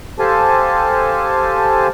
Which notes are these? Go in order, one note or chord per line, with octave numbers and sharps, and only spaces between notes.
G4 A4 C5 F5 G#5 A5